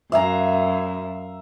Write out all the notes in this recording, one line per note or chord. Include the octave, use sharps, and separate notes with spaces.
F#2 E5 F5 A#5